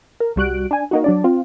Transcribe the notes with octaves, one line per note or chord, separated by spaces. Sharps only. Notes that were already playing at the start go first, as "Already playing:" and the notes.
A#4
C2 G3 F#4 F#6 D7
D4 G#5
A#3 D#4 F#4
F#3 D4 D5
C4 F4